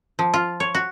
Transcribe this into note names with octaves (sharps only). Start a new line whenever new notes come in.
F3
F4
C#5
F#4